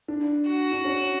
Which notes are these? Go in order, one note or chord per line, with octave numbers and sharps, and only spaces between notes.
D4
F#4
D4
C#4